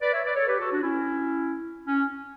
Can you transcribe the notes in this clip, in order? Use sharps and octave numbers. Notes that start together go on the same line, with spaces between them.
B4 D5
C#5 E5
B4 D5
A4 C#5
G4 B4
F#4 A4
D4 F#4
C#4 E4
C#4